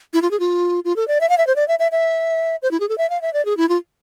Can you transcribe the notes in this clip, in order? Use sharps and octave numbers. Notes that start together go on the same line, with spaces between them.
E4
F4
G#4
F4
F4
A4
D5
E5
F5
E5
C5
D5
E5
E5
E5
C5
E4
G#4
A4
E5
F5
E5
D5
G#4
E4
F4